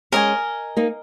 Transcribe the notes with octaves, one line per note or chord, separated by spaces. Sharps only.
G#3 C#4 A#4 D#5 G#5
A#3 D#4